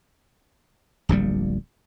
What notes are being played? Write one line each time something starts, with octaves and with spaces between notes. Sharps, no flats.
D1 A#1 A#2 G3